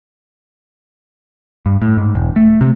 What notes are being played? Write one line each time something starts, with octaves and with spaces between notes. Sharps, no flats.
G2
A2
G#2
E1
A3
C3